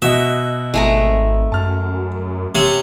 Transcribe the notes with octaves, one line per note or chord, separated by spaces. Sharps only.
B2 F#4 D#5 E5
G#1 G#3 A3 A#5
F#2 A5 F6
C3 C#4